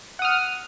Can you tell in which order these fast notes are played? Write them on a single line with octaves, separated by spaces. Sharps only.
F#5 D#6 F6